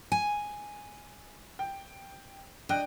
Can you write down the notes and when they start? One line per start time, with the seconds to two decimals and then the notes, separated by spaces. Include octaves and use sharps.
0.12 G#5
1.59 G5
2.69 D4 D#5 G5 F#6